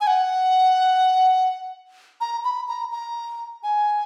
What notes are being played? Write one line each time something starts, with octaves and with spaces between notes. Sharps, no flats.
G#5
F#5
A#5
B5
A#5
A#5
G#5